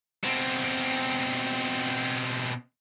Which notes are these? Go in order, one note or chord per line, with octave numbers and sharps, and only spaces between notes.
B2 C4